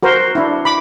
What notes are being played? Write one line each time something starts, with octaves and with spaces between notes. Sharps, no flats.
F#4 A#4 C5
D4 E4
B5 D6